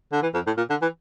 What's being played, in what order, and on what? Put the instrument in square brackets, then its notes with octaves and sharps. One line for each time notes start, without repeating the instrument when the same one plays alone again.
[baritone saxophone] D3
E3
F2
A2
A#2
D3
E3